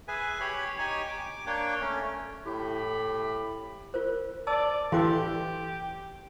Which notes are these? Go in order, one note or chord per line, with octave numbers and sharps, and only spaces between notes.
G#4 B4 E5 G#5
G4 C#5 B5
D#4 G4 C#5 G#5
D6
A#3 D4 C#5 G5
A3 C#4
A2 E4 G4 B5
F4 A#4 C5
D5 A5 E6
E3 G4 A4 C6 D6